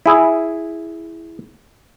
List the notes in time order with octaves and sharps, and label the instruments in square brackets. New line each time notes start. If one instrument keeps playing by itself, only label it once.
[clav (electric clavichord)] E4 G#4